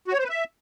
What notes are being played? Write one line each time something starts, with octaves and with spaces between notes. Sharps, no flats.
F#4
C#5
C5
B4
E5